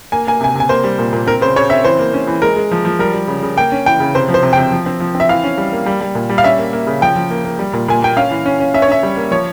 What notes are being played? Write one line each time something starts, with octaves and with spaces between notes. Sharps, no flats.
A#3 G#5
A#3 G#5
C3 G#5
C3 G#5
A#3 C5
G3
A#2
A#2
C4 A#4
C#3 C5
C#3 C#5
C4 E5
E3 C5
A#3
C#4
E3
G#3 A#4
G#3
F3
F3
G3 A#4
G3
C#3
C#3
A#3 G5
C#4
E3 G5
C#3
C3 C5
F3
C5
C3
C3 G5
F3
C4
F3
C4
E5
E3 F5
C#4
G3
A#3
G3
G3
A#2
G3
F5
C#4 E5
A#3
A#3
C#3
F3 G5
F3
A#3
A#3
G3
A#2
A#2 G#5
A#3 G5
C#4 F5
E3
C#4
C#4
C#4 E5
C#5
C#4 E5
G3
A#3
F3 C#5